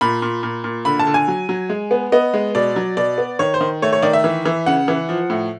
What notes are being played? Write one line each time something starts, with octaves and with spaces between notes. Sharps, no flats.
A#2 B5
A#2
A#2
A#2
D3 B5
A5
D3
G#5
F#3
F#3
G#3
B3
B3 D#5
G#3
B2 D5
F#3
B2 D5
B3
D#3 C#5
C5
D#3
A3 C#5
C#5
D#3 D5
E5
E3
E3
C#3 F#5
E3
F3
A2